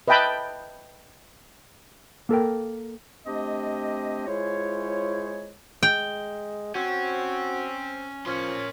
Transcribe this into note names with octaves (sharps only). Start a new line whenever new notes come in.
B4 D#5 E5 G5 A5 B5
A#3 A4 A#4 G5
A3 C4 D4 G4 C5 D#5
G#3 E4 F4 G#4 C5 C#5
G#3 G5
C4 C#4 F#4
F3 C#4 A#4 C6